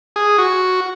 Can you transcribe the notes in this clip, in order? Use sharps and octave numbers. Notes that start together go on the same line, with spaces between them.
G#4
F#4